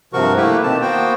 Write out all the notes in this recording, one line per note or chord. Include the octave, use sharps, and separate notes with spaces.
G2 C3 F3 F#4 A#4 C#6
A3 A#3 E4 G4 B4
B2 D#3 C4 A5
A#3 B3 F#4 C5 G5